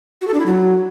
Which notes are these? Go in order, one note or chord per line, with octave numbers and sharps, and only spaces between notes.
F#4
A4
D4
E4
F#3